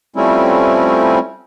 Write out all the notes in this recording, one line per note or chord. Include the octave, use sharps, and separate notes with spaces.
F3 G3 A3 C4 C#4 E4